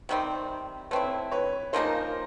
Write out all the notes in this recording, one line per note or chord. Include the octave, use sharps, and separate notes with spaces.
C3 D#3 G3 C4
A3 C4 E4 B4 C#5
B4 C#5
C#3 F3 A#3 D#4 A#4 C5